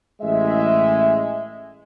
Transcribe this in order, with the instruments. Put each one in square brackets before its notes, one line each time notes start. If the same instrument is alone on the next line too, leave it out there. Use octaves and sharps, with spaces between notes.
[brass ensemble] A1 G#3 E5